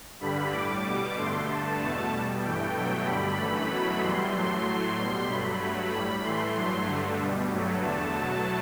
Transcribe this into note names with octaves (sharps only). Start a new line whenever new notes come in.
G2 D3 G3 B5
A2 G3 D6
B2 G3
G2 D3 A3 C6
G2 D3 A3 A5
E2 B2 A3
B2 G3
G2 E3 A3 G5
B2 F#3 A3
G2 D3 G3 B5
F#2 E3 A3
B2 F#3 A3 B5
F#2 E3 G3 C6
A2 F#3 A3
A2 F#3 A3 C6
B2 G3
G2 F#3 A3 B5
G2 F#3 A3
A2 G3 B5
A2 E3 A3 C6
G2 F#3 A3 C6
G2 D3 A3
B2 G3
G2 F#3 A3
E2 D3 A3 A5
B2 F#3 A3